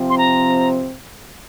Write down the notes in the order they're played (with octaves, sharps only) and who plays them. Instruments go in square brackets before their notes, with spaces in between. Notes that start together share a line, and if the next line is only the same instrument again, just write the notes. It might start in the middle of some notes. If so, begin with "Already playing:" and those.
Already playing: [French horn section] C3 F3 C4
[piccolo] C6
A#5